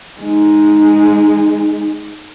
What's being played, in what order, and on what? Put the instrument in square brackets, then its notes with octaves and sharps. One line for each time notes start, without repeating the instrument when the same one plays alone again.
[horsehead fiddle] G#3 D#4